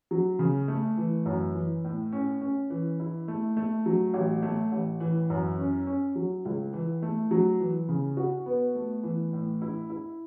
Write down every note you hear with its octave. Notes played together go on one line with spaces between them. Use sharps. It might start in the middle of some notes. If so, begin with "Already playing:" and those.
F#3
C#3
A3
E3
F#2
E3
A2
C#4
C#4
E3
E4
A3
A3
F#3
A1
A3
A1
E3
F#2
C#4
C#4
F#3
C#2
E3
A3
F#3
E3
C#3
F#4
B3
A3
E3
A2
E4
E4